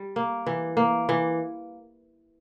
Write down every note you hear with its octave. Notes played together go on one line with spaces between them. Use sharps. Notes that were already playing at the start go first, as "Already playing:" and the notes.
Already playing: G3
A#3
E3
A#3
E3